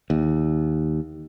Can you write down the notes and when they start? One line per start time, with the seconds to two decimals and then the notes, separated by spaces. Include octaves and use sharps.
0.10 D#2